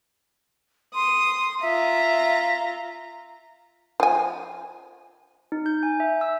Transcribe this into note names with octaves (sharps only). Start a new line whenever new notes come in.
C6 D#6
F4 E5 A#5
F3 G#5
D#4
G6
G#5
E5
E6